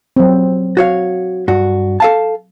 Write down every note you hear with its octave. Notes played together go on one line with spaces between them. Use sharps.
F#3 C4
F#4 C#5 F5
G2 F#4
A4 F5 A5